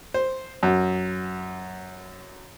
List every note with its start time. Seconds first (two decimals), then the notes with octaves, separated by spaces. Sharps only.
0.14 C5
0.63 F#2